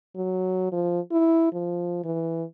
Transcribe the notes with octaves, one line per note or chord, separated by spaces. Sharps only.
F#3
F3
E4
F3
E3